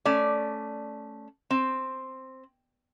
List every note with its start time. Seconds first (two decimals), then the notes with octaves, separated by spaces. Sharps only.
0.05 A3 C#4 D5
1.50 C4